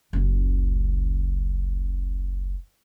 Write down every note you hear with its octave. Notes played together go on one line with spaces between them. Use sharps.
F#1 C#2